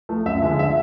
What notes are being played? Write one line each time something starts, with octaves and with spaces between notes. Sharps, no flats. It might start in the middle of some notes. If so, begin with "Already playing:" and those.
F3 A3
F#2 E5
D3 F3 G#3
E5